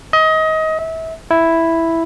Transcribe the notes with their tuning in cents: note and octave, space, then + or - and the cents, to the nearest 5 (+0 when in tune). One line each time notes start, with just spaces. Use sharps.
D#5 +25
E5 -30
E4 +0